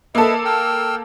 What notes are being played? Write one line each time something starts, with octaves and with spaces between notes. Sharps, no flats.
A#3 A4 B4 D#5 E5
G5 E6 F6